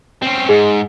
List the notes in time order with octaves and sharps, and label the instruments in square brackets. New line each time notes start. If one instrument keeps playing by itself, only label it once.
[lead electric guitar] C4 C#4
[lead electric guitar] G#2 [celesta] G#4